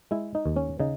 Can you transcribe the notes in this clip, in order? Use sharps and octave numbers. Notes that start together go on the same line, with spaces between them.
G#3 E4
D#4
D#2
C#4
C#3 D#4